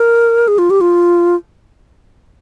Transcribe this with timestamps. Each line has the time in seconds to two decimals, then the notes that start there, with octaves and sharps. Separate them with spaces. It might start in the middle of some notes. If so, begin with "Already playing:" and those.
Already playing: A#4
0.48 G#4
0.58 F4
0.70 G4
0.81 F4